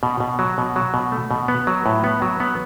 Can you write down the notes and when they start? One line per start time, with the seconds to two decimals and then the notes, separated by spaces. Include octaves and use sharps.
0.03 B2
0.20 B2
0.39 F#3
0.58 B2
0.76 F#3
0.94 B2
1.12 A3
1.31 B2
1.48 B3
1.67 F#3
1.86 A2
2.04 B3
2.22 F#3
2.40 B3